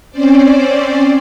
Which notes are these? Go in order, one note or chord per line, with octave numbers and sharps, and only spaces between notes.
C4 C#4 C5 D5